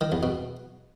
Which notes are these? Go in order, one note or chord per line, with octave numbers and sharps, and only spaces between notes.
D#3
E2
B2